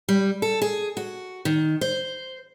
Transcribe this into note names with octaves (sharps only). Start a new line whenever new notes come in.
G3
A4
G#4
F#4
D#3
C5